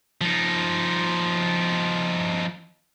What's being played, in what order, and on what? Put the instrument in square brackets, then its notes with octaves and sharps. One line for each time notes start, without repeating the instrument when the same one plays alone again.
[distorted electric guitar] F3 D#4